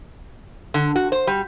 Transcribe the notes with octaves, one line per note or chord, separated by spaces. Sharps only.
D3
F#4
C5
G3